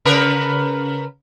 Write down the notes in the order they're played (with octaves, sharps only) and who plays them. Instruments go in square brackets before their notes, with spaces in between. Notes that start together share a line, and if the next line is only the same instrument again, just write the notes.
[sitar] C#3 A#4 B4